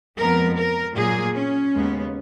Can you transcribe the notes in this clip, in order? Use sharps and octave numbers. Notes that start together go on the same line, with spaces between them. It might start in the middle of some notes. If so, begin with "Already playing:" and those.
F2 F3 G#3 B3 A#4
A#4
A#2 F#3 A#3 G#4
C#4
D#2 C#3 G#3 B3